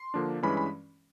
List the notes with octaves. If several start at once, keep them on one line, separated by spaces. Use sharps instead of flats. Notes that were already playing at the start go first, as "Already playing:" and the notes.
Already playing: C6
D3 F3 A#3 D4
G2 E3 G#3 C#4 B5
B5